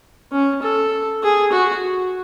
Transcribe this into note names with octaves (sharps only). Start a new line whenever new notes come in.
C#4
A4
G#4
F#4